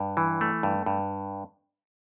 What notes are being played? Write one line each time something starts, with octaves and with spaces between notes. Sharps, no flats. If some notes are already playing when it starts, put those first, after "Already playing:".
Already playing: G2
E3
A3
G2
G2